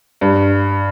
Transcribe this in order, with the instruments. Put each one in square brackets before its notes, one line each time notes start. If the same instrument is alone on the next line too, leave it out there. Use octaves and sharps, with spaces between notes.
[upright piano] G2